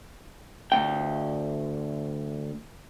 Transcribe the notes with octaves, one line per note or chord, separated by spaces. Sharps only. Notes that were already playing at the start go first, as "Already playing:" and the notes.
D2 G#2 G5